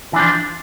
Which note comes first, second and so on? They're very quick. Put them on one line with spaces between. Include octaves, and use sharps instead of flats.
E3 D4 F3